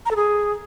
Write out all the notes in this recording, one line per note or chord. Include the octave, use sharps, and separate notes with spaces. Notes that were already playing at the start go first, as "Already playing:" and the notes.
A#5
A4
G#4